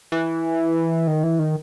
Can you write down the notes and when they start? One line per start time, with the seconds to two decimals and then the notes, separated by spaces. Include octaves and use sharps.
0.12 E3
1.07 D#3
1.23 E3
1.39 D#3